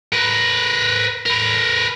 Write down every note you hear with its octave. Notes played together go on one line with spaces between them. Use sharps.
A#4 B4
A#4 B4